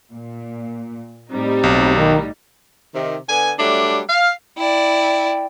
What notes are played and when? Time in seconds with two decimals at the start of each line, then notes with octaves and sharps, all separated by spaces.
0.13 A#2
1.32 A2 G3 C4 D#4
1.63 B1
1.96 D#3
2.94 C3 D#3
3.28 D3 B3 G#5
3.59 F#3 G3 A3 D4
4.08 F5
4.58 E4 D5 G5